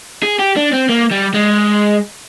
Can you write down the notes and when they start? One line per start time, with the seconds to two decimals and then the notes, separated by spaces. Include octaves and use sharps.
0.23 G#4
0.39 G4
0.57 D4
0.73 C4
0.89 A#3
1.11 G3
1.34 G#3